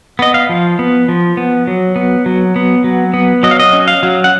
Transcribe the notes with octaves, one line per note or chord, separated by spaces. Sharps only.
B3 D#5
F5
F3
B3
F3
B3
F#3
B3
F#3
B3
F#3
B3
F#3 D#5
F5
D#5
C#4
F5
F#3
F#5